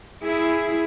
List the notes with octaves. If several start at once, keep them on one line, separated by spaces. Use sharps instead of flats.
E4 G#4